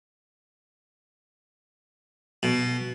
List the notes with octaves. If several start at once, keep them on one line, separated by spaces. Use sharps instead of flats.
B2